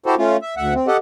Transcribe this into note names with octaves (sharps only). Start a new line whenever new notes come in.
E4 F#4 G4 A4 C5
A3 C#4 F4
E5
D2 E5 F#5
C4
G4 A4 D#5 F#5